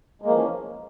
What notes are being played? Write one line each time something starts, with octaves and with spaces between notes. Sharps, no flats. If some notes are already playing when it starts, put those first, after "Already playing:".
E3 F3 G#3 A#3 C#4